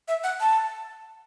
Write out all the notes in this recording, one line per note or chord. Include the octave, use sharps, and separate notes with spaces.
E5
F#5
A5